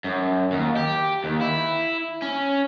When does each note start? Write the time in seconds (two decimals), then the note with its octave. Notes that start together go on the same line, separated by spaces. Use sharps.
0.04 F#2
0.52 D#2
0.76 G4
1.24 D#2
1.41 E4
2.22 C#4